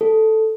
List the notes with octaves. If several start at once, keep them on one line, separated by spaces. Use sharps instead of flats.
A4